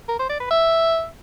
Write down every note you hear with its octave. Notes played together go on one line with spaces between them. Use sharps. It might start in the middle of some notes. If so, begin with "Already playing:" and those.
A#4
C5
D5
B4
E5